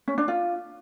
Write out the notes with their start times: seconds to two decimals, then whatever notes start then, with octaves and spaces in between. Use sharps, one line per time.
0.08 C#4
0.18 D4
0.28 F4